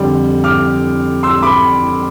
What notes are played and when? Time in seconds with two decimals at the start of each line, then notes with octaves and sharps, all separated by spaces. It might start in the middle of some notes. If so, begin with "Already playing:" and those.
Already playing: F2 D3 G3
0.44 D6 F6
1.23 C6 E6
1.43 B5 D6